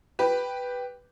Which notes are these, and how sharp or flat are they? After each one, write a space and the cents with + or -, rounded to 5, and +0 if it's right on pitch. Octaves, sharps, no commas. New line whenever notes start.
G4 +0 B4 +0